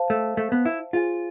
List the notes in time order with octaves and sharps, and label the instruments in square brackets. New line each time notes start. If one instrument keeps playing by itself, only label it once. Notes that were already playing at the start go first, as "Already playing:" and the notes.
Already playing: [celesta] C5 F5 A5
[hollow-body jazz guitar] A3
A3
B3
E4
[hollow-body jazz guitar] F4 [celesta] G#4 C5 F5 G#5